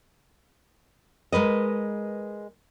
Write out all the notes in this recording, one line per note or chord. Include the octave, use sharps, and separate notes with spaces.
G#3 A#4 B4 D#5